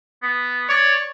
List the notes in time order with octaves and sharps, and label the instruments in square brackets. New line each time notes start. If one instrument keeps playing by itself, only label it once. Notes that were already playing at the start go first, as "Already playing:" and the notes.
[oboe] B3
[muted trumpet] C#5 [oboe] D5